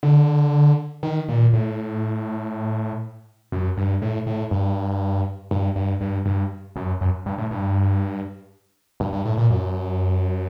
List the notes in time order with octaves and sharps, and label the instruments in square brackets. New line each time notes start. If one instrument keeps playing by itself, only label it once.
[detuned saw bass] D3
D#3
A#2
A2
F#2
G2
A2
A2
G2
G2
G2
G2
G2
F#2
F#2
G2
A2
G2
G2
G2
A2
A#2
F#2